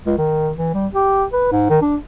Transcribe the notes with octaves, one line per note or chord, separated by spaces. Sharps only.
C#2
D#3
E3
G3
G4
B4
G#2
D#3
D4